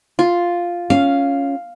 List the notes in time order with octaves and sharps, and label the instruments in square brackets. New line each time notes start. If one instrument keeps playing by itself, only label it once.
[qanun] F4
[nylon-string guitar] C#4 [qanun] F5